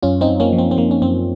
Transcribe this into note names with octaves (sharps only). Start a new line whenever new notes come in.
F#2 C#4 F4
C4 D#4
F#2
A#3 C#4
F3
C4
C4
F3 A#3
C#4
F#2 C4